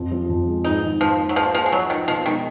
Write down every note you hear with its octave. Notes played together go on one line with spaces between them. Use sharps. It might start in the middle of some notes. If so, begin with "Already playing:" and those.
Already playing: F2
F3
F2
G#3
G#2 D#4
D#3
G#2 F3
A#3
F#3
F3 G#4
F3 A#3
G#3
F3 F#3
D#3 D#4
B2 F3
D#3 G#3